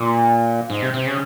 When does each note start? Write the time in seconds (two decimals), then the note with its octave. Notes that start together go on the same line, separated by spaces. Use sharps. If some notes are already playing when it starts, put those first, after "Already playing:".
Already playing: A#2
0.70 G#2
0.82 C3
0.94 C3
1.07 C#3